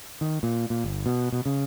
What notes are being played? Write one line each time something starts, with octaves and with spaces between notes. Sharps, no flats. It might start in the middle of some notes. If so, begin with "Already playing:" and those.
D#3
A#2
A#2
G1
B2
B2
C#3